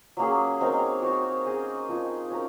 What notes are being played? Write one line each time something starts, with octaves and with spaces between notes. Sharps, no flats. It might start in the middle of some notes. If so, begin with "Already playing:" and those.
F#3 A#3 C#4 G#4
F#3 C4 D#4 A#4
C4 F#4 C#5
C#4 G#4 C5 D#5
F3 C4 D#4
C#4 F#4 A#4